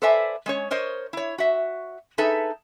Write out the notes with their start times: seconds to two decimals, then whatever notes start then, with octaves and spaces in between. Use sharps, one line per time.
0.02 A4 B4 C5 D5 E5 G#5
0.46 G#3 C#4 C#5
0.71 A#4 C5 C#5 D#5
1.13 E4 C#5
1.38 F#4 E5
2.18 D#4 G#4 A4 B4 E5